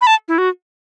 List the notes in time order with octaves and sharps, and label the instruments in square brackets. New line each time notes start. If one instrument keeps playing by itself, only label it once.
[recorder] B5
A5
E4
F#4